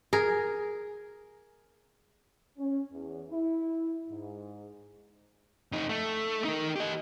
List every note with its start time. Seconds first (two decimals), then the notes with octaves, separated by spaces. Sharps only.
0.13 G#4 A#4
2.58 C#4
2.91 E2
3.30 E4
4.09 G#2
5.72 F2 D#4
5.90 A3
6.44 D#4 A#4
6.76 G4 D#5